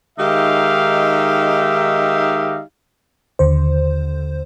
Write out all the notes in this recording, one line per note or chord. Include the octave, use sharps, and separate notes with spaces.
D#3 G#3 D#4 G4 E5 F5
D#2 D3 C5